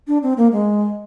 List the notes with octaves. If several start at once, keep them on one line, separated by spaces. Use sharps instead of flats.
D4
C4
A#3
G#3